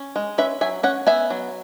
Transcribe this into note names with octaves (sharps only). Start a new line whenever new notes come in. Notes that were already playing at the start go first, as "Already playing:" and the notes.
Already playing: C#4
G#3
C#4 B4 E5
F#3 E5 G#5
C#4 C#5 F#5
B3 E5 G#5
F#3